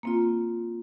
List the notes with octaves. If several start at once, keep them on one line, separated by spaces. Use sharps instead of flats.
A#3 C4 F4